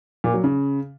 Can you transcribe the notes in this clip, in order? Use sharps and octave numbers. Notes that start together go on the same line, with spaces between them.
A#2
F#3
C#3